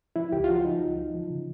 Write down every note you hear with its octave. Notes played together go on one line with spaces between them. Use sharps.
F3 E4
C#2 G4
F4
F3 F#4
F3 D#4
C#2
F3
F3
C#3